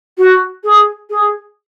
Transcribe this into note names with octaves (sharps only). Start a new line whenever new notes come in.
F#4
G#4
G#4